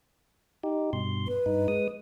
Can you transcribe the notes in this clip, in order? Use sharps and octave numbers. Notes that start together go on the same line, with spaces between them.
D#4 G4
G2 B2 C6
B4
G2 D#4
G#3 D#6